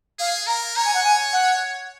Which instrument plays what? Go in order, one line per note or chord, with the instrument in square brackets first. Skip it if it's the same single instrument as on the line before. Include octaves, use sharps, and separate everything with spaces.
[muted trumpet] G#4 [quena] F5
[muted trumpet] A#4 [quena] A#5
[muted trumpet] C#5 [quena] A#5
[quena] G#5
F#5
G#5
F#5